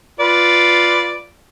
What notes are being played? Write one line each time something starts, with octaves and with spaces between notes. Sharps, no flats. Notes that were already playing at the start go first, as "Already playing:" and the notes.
F4 B4 D5